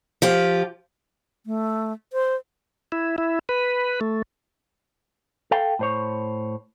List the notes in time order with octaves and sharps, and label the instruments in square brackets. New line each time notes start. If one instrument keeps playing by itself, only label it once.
[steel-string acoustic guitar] F3 F4 G4
[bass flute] A3
C5
[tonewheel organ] E4
E4
B4
A3
[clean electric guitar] A4 F5 G5
A2 C5 C#5